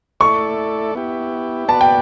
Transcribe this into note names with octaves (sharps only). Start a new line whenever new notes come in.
A3 E4 A4 D5 C#6
B3 E4 G4
B3 F#4 B4 D5 A5
G5